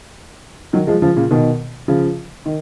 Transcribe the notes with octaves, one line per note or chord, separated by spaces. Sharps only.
D#3 F#3
F3 G#3
C#3 F3
A#2 C#3
B2 D#3
C#3 F3
D#3